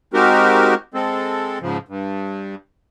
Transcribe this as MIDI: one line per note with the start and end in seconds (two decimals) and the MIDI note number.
0.14 0.74 56
0.14 0.74 60
0.14 0.74 63
0.14 0.74 66
0.14 0.74 67
0.14 0.74 70
0.94 1.58 56
0.94 1.58 60
0.94 1.58 69
1.62 1.78 44
1.62 1.78 49
1.62 1.78 53
1.88 2.55 43